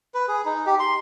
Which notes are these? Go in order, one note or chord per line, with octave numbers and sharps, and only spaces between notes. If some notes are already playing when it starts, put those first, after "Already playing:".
B4
G#4
D#4
G4
C6